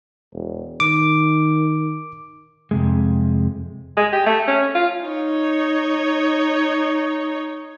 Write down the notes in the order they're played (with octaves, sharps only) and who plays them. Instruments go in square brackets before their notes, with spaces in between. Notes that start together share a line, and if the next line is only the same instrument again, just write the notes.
[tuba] E1
[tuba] D#3 [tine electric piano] D6
[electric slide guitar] F2 C3 G#3
[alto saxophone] G#3
G4
A3
C#4
F4
[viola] D#4 C#5